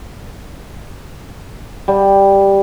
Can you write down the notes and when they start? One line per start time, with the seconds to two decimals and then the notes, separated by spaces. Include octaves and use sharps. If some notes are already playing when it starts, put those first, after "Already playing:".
1.88 G3